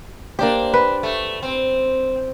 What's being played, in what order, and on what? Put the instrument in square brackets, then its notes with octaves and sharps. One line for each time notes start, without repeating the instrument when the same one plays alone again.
[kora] A#3 G4 [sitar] D4 C5
[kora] B4
[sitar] A3
C4